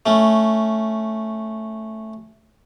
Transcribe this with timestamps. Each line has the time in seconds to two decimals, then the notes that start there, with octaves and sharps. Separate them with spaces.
0.06 A3 C#4